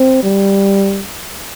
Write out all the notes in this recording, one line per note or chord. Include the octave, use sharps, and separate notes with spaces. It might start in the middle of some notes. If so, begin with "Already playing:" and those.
Already playing: C4
G3